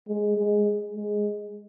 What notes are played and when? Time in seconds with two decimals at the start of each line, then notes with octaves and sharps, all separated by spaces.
0.08 G#3
0.38 G#3
0.96 G#3